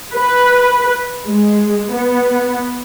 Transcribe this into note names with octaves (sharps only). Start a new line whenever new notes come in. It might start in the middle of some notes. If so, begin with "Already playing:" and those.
B4
G#3
B3